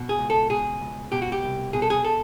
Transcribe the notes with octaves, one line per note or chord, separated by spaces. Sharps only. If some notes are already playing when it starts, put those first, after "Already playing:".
Already playing: B2
G#4
C#2
A4
B2 G#4
C#2
B2 G4
F#4
G4
C2
B2 G#4
A4
G#4
A4